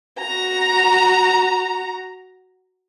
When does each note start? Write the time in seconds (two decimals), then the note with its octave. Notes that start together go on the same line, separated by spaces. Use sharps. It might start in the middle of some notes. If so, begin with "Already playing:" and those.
0.20 F#4 A#5